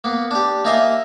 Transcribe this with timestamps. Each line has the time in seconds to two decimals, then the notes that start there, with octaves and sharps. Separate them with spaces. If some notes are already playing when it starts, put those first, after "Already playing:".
0.04 A#3 B3
0.31 D4 G4
0.65 A#3 D#4 F4 D#5 E5 G#5